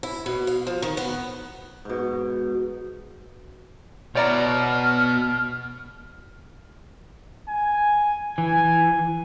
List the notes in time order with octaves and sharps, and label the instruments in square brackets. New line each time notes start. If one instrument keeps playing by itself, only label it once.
[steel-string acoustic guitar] E4
B2
F5
F3
D#3
B3
[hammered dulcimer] G#2 B2
[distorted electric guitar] B2 [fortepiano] C#5 D5 A#5 [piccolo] F6
[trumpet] G#5
[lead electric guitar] E3 [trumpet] G#5